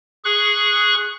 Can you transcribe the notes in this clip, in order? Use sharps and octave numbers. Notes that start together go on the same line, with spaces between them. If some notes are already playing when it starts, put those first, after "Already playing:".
G#4 C#6 F#6